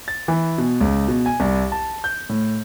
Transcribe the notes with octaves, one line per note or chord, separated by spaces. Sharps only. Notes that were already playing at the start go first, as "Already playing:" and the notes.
A6
E3
B2
C#2
B2
G#5
C2
A5
G6
A2